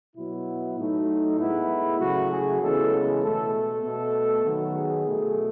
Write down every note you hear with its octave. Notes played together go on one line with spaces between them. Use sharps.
B2 F#3 B3 E4
A2 F#3 A3 D#4
A2 G#3 B3 E4
C#3 F#3 A3 F#4
G#4
C#3 E3 G#3 B3 A4
B2 A3 A4
A4
B2 A3
D#3 F#3 B3
G#4
B2 A3